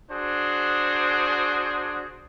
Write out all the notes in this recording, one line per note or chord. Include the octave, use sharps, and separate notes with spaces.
D4 F#4 G#4 C5